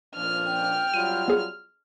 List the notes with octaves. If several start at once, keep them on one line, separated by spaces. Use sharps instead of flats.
A#2 F3 D4 F6
G5
F#3 G3 F4 D#7
B3 G#4